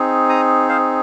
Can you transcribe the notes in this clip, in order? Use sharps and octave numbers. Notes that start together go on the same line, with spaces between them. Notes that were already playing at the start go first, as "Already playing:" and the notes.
Already playing: C4 D#4 G#4
A#5 D#6
C5 F5